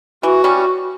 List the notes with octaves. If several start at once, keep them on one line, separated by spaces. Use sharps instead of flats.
E3 F#4
G3 C#4